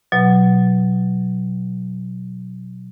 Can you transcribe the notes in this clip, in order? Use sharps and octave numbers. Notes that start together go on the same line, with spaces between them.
B2 F#3